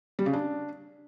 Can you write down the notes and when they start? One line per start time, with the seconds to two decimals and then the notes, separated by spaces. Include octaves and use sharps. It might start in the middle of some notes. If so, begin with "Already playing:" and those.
0.19 G3
0.26 C#3
0.33 D4